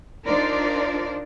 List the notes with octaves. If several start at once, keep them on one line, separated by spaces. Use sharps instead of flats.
D4 D#4 F4 A#4 C5 D5